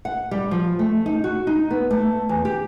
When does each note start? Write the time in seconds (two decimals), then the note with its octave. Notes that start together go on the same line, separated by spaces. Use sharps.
0.05 F#5
0.31 G3
0.51 F3
0.79 A3
1.06 D#4
1.24 F#4
1.47 D#4
1.71 B3
1.91 A3
2.29 E2
2.45 G4